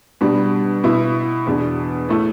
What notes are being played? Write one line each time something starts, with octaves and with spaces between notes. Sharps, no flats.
B2 G3 D4
B2 B3 E4
E2 B2 B3 D4
A2 A3 E4